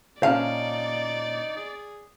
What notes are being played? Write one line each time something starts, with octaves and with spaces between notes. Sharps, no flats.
A#2 C#4 D#4 D5 F5 A5
G#4